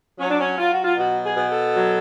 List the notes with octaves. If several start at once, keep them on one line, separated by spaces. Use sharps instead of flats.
F#3 C#4
D4
C#4
F#3 F4
F#4
F4
B2 F#4
G#4
B2
A4
F#3